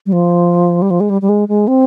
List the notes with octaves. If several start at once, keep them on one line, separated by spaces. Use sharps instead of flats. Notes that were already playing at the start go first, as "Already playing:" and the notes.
G3
F3
G3
F3
G#3
G3
G3
G#3
G#3
C4